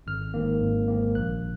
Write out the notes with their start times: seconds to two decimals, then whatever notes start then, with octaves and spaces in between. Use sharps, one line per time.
0.07 G#1 F6
0.34 G#2 D#3 A#3
0.61 G#1
0.88 G#2 D#3 A#3
1.15 A#1 F#6